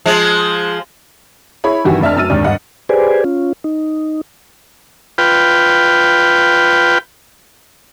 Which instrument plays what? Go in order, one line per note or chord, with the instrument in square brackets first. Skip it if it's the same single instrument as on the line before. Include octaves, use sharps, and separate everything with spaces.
[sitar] F3 G#3
[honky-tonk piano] E4 G#4 C#5 B5
G2 D#3 E3 F#4 G4
F1 D4 E5 A5 F6
F#2 E6 A6 D#7
D#2 G#2 D#3 D4
G2 D#5 F#5
[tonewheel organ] G4 G#4 B4 C5 D5 G#5
C#4 F4
D#4
[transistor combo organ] F4 B4 G5